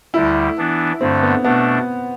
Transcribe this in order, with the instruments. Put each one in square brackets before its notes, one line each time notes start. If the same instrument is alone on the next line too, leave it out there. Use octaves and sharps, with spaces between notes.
[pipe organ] D2 D3 G3 [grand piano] E4
[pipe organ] E3 B3 D4
[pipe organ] G2 D3 A3 [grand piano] C4
[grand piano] B3
[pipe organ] B2 A3 D4 [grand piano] B3